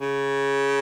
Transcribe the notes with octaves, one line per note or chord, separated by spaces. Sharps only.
C#3